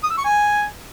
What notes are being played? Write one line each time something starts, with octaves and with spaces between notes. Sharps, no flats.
D#6
E6
C#6
G#5